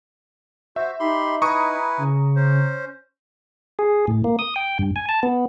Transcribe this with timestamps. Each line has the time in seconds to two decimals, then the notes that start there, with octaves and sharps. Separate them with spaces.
0.76 F#4 C5 E5
1.00 D#4 G4 B5 C6
1.42 E4 B4 G#5 A#5 C#6 D#6
1.98 C#3
2.36 C#4 C5
3.79 G#4
4.07 A2
4.24 A#3
4.39 D#6
4.56 G5
4.79 G2
4.96 G#5
5.09 A5
5.23 B3